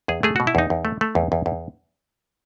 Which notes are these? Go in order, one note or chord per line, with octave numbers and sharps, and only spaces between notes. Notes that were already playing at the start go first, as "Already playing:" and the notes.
E2 G#4
A3 G#4
B2 F#4
E4
E2 D#4
E2
A3
A3
E2
E2
E2